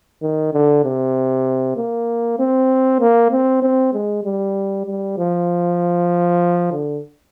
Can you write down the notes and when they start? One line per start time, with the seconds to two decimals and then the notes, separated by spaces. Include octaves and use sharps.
0.22 D#3
0.54 D3
0.84 C3
1.77 A#3
2.39 C4
3.01 A#3
3.32 C4
3.63 C4
3.93 G#3
4.24 G3
4.87 G3
5.18 F3
6.73 D3